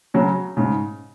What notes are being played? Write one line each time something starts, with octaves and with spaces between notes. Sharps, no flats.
C#3 F#3
G#2 C#3